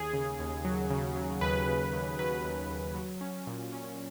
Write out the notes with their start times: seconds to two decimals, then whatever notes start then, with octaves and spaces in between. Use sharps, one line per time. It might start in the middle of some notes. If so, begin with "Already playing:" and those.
Already playing: D#2 G#4
0.14 C#3
0.39 D#2
0.65 F#3
0.90 C#3
1.16 F#3
1.41 D#2 B4
1.68 C#3
1.93 D#2
2.19 F#3 B4
2.44 D#2
2.70 D#2
2.95 F#3
3.21 C#4
3.47 A#2
3.73 C#4